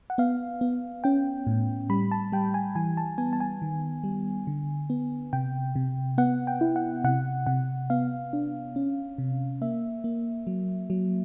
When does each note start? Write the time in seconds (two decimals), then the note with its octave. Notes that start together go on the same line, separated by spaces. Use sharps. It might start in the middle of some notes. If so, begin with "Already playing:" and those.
0.10 F#5
0.18 B3 F5
0.61 B3
1.04 C#4 G5
1.47 A2
1.90 G3 B5
2.11 A5
2.32 G3 G5
2.54 G#5
2.75 E3 G#5
2.97 A5
3.18 B3 G#5
3.33 A5
3.40 G#5
3.62 D#3
4.04 G3
4.47 D3
4.90 B3
5.33 C3 G5
5.76 C3
6.18 B3 F#5
6.47 G5
6.61 E4
6.76 F#5
7.04 C3 F#5
7.46 C3 F#5
7.90 B3 F5
8.33 D4
8.76 C#4
9.18 C3
9.62 A#3 E5
10.04 A#3
10.47 F#3
10.90 F#3